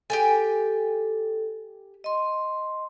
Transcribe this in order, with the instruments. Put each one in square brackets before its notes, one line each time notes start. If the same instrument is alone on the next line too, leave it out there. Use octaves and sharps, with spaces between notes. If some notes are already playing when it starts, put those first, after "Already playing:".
[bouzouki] G4 G5 G#5 [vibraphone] A4
[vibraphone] D#5 C6